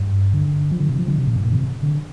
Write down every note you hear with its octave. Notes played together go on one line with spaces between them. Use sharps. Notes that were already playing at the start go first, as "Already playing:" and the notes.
Already playing: G2
D3
F3
D3
C3
F3
D3
C3
A#2
G2
A#2
D3
C3
D3